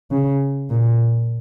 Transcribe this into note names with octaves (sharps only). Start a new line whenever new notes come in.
C#3
A#2